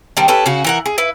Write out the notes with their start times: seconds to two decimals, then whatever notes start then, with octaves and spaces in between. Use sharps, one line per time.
0.17 D#3 G3 C4 D4
0.28 C#4 G4 A4 B4
0.46 C#3 C#4 F#4
0.64 E3 A#4 F#5
0.86 G#4
0.98 E4 B4